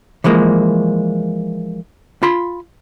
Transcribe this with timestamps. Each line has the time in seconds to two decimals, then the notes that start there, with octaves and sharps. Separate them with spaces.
0.24 E3 F3 G#3 A#3
2.23 F4 B5 C6